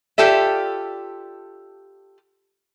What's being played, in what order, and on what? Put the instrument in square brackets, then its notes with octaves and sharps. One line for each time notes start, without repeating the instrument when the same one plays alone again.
[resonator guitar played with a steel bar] F4 G4 A4 D5 E5